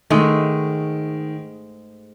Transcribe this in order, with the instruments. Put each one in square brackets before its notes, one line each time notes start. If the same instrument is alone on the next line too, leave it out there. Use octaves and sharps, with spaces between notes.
[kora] G#2 G#3 A3 [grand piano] D#3